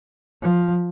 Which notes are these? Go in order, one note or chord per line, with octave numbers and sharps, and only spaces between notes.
F3